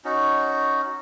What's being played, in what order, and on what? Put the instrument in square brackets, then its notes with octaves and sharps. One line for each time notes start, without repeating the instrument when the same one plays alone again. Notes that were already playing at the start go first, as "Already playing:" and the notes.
[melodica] C#4 D#4 F#4